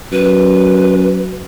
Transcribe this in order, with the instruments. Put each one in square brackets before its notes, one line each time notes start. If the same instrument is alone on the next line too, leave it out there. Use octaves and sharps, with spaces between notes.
[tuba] F#2 [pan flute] B4